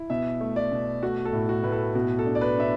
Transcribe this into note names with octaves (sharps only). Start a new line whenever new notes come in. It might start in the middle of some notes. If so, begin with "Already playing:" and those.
Already playing: E4
B2 E5
A3
D5
B2
A3 F#4
A4
A2
F#4
A2 B4
A4
B2 F#4
A4
D4
D5
B4
D4 E5